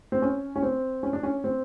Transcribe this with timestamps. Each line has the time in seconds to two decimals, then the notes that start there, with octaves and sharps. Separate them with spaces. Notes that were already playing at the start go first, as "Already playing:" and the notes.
0.12 C4
0.22 C#4
0.56 C#4
0.63 C4
1.03 C#4
1.13 D4
1.23 C#4
1.44 C4